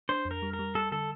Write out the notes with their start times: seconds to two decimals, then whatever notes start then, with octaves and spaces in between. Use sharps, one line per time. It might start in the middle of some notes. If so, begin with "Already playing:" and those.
0.09 D4 C5
0.25 F2
0.31 A#4
0.42 G3
0.53 A#4
0.59 G3
0.75 G3 A4
0.92 D3 A4